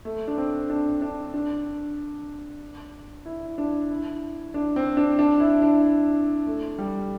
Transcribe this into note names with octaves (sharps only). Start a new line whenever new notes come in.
A3
D4
C4
D4
D4
D4
E4
D4
E4
D4
C4
D4
D4
E4
D4
A3
G3